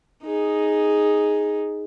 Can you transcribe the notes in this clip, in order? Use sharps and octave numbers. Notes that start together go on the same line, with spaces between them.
D#4 G#4